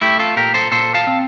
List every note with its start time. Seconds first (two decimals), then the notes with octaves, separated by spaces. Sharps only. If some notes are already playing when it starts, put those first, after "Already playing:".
0.01 A3 E4 G4
0.19 F4 A4
0.36 A#2 G4 A#4
0.54 A4 C5
0.72 A#2 A4 C5
0.94 F5 A5
1.07 C4